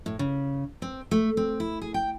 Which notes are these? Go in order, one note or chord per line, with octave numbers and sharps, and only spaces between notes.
A2
C#3
C4
A3
C4
E4
G#4
G5